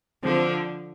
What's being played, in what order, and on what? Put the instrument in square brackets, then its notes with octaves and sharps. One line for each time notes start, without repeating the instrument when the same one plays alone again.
[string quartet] D3 F3 [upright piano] C4